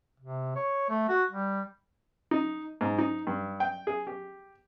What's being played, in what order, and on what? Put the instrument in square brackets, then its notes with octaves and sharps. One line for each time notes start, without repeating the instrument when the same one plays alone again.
[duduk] C3
C#5
A3
F#4
G3
[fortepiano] D#4
G#2
D#4
G2
G5
G#4
G4